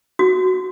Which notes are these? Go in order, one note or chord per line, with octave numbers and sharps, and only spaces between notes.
F#4